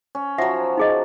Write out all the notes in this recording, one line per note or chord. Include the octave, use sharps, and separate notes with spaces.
C#4
F3 F#3 E5 F#5
D#4 G#4 D#5